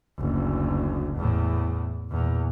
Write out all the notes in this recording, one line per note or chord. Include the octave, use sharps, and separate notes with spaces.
F#1 D2
E2 A2
E2 A#2